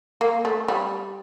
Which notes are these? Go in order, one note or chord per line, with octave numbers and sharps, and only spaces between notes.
A#3
A3
G3